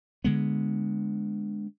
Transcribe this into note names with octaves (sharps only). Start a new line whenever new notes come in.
D3 G#3 B3